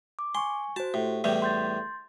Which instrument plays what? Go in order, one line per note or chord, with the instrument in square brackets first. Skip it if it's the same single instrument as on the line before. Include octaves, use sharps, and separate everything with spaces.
[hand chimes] D6
[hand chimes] G#5 C#6 [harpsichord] C6
[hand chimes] F#4 C5 [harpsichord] A5
[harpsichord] A2 [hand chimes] G4
[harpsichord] E2 A2 G3
[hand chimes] C6 G6 A6